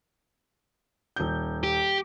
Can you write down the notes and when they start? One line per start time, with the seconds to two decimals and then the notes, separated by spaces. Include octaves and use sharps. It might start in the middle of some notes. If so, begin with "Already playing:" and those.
1.16 D#1 G6
1.64 G4